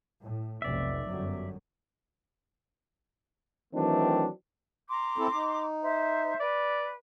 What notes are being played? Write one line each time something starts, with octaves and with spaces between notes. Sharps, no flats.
A2
F1 B1 D5 E5
G1 F#2 F#3
D#3 E3 F#3 A3 C4 D4
A#5 C6 D6
C4 E4 A4
D#4
C5 E5
B4 D5